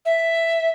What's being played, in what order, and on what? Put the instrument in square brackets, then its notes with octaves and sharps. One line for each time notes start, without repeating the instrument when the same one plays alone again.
[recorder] E5